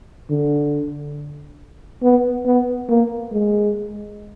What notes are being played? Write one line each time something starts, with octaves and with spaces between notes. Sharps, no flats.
D3
B3
B3
A#3
G#3